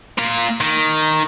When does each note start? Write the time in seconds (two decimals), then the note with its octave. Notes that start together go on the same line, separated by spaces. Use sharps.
0.18 A#2 F4
0.61 D#3